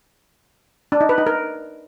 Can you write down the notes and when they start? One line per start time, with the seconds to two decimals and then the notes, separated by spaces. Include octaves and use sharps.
0.92 D4
1.01 D#4
1.09 B4
1.18 D#4
1.27 A#4